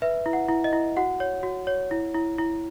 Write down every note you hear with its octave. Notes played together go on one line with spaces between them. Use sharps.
B4 E5
E4
F#5
E4
D#5
E4
F#4 F#5
C#5
F#4
C#5
E4
E4
E4